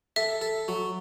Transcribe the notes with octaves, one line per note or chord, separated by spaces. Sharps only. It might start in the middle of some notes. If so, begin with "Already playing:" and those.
A4 E5
A4
F#3